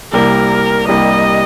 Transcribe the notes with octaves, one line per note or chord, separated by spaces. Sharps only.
C2 C3 G3 A#3 A#4
C2 C3 G3 A#3 D#5